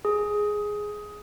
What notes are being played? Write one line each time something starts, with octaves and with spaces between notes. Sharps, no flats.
G#4